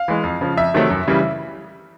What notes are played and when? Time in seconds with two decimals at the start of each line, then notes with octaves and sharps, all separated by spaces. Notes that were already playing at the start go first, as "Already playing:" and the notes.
Already playing: F5
0.08 E3 G#3
0.24 F2
0.41 C#3 F3
0.57 F2 E5
0.74 C3 D#3 F#3 A3
0.90 F#2
1.07 C#3 E3 G3